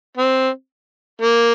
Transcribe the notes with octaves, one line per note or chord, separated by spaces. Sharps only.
C4
A#3